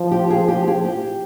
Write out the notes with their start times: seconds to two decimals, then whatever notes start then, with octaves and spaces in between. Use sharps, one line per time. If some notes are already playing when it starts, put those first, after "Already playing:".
Already playing: F3
0.11 G4
0.30 G#4
0.48 G4
0.68 G#4
0.85 G4